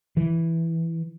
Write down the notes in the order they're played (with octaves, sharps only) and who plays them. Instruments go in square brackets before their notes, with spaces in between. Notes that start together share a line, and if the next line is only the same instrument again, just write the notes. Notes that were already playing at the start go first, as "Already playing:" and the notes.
[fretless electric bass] E3